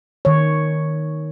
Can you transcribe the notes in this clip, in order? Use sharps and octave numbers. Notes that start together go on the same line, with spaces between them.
D#3 C#5